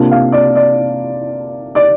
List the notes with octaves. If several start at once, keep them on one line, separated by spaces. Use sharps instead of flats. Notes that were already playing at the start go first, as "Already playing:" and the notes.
Already playing: C3 A#3 D4 F4
F5
D5
D5
D5